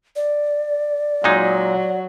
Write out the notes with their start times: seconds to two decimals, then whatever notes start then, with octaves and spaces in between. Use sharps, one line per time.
0.16 D5
1.24 A#2 F#3 G#3 D#4